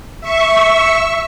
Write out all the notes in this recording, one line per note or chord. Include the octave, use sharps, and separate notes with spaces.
E5 C#6